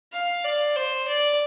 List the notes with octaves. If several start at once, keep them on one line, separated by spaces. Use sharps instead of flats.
F5
D5
C5
D5